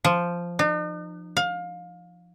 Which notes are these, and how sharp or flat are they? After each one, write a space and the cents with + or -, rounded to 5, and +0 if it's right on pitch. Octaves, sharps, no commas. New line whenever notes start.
F3 -5
D#4 -45
F5 +25